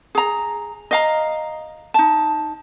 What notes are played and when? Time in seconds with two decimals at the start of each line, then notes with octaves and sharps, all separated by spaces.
0.15 G#4 A#5
0.91 D#5 F5 A#5
1.94 D#4 A5